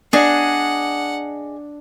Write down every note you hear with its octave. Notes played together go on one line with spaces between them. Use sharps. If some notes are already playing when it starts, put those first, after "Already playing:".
D4 G#4 D#5 F#5